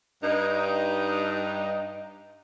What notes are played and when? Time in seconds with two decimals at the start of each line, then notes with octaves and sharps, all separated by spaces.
0.23 G2 D#4